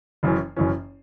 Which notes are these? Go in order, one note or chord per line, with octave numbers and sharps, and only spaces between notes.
F#1 F#2 E3 C#4
F#1 F#2 E3 C#4